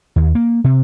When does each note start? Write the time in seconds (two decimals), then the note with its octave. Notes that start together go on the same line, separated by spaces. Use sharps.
0.16 D#2
0.35 A#3
0.64 C3